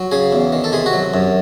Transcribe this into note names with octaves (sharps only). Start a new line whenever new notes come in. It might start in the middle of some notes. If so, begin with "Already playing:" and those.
Already playing: F#3
C#3 G#4
E2
D#3
A4
C3 G#4
F#4
F#3
F#2